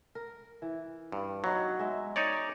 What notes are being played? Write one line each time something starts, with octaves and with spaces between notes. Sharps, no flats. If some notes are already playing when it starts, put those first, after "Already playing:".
A#4
E3
G2
F#3 B3 D#4
G#3 E5
D#4 C#5 D5